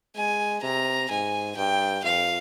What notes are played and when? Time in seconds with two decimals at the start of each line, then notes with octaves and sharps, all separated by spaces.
0.16 G#3 G#5
0.63 C3 A#5
1.10 G#2 G#5
1.56 G2 G5
2.04 F2 F5